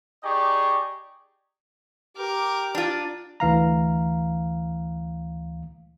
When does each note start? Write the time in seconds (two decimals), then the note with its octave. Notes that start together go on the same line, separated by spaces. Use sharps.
0.23 D#4 G4 G#4 D5 C#6
2.17 G4 A#4 D6
2.75 D4 F4
3.40 D2 E3 F5 A#5